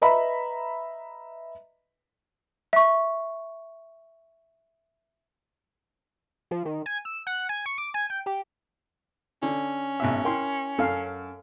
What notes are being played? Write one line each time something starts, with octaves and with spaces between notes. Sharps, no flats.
B4 D#5 E5 A#5 B5
E5 C#6
F3
D#3
G#5
E6
F#5
G#5
C#6
D6
G#5
G5
G4
D3 C#4
G#1 B2 E5
E4 A#4 G5 C6
F#2 A4 F5